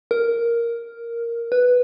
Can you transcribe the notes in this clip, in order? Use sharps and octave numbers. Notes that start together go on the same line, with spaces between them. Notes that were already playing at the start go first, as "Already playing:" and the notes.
A#4
B4